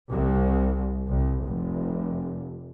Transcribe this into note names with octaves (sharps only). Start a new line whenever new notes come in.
C2
C2
F1